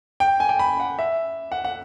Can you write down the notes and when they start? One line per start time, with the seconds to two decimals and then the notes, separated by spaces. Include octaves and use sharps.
0.20 G5
0.40 G#5
0.49 G5
0.59 B5
0.80 F#5
0.99 E5
1.52 F#5
1.64 F#5